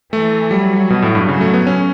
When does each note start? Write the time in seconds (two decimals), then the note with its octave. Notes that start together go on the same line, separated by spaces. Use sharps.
0.13 E3 A3
0.51 F#3 G3
0.90 B2
1.02 A2
1.15 G2
1.28 C#3 F#3
1.41 A3
1.54 B3
1.67 C#4